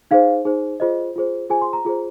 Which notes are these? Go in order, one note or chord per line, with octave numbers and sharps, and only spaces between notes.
D#4 G#4 C5 F5
D#4 G#4 C5
F4 G#4 C5 D#5
F4 G#4 C5
F4 G#4 C5 G#5
C6
A#5
F4 G#4 C5